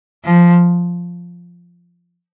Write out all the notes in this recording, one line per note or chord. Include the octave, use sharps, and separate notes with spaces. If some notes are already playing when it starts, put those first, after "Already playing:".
F3